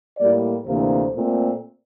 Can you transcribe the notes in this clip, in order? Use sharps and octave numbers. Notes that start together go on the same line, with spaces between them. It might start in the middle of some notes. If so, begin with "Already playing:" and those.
A2 G3 A#3 D5
D2 C3 E3 A#3 C5
A#2 A3 C4